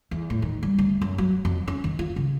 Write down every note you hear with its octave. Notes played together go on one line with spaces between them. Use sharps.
E2
A2
D#3
G3
D2
F#2
F#3
F2
C#4
D#3
F4
C#3